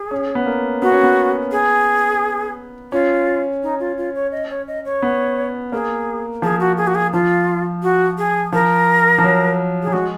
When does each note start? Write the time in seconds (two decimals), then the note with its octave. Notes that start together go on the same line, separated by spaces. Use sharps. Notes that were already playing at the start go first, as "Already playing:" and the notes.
Already playing: G#4
0.11 C#4
0.35 B3
0.46 A#3
0.82 B3 F#4
0.92 C#4
1.03 B3
1.52 G#4
2.92 C#4 F4
3.63 D#4
3.80 F4
3.97 F4
4.15 C#5
4.32 D#5
4.50 C#5
4.67 D#5
4.85 C#5
5.02 B3
5.72 A#3 G#4
6.42 F3 G#4
6.60 F#4
6.77 G#4
6.87 F#4
6.95 G#4
7.13 F3 F4
7.83 F#4
8.18 G#4
8.52 F3 A#4
9.18 F3
9.24 F#3
9.83 F#3 G#4
9.93 G#3 F#4